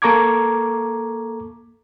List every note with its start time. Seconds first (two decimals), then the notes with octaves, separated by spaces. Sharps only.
0.02 A#3 A4 A#5 C#6 D6 G#6